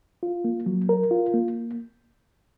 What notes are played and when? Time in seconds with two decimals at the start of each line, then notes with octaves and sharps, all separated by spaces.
0.23 F4
0.44 A#3
0.66 F#3
0.89 A#4
1.11 F4
1.34 A#3